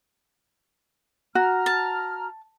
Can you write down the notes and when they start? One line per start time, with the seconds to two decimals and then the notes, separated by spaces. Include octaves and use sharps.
1.35 F#4 A#5 F6
1.66 A5